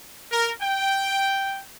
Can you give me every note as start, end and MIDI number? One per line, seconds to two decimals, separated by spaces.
0.32 0.52 70
0.61 1.60 79